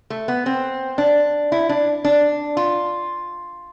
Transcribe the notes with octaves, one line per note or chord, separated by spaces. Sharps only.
A3
B3
C4
D4
E4
D4
D4
F4